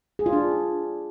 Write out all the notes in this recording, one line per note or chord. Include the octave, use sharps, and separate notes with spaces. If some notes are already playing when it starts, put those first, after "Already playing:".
G#4
F4
D4